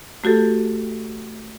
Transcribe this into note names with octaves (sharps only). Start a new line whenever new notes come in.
A3 F#4 G4 A4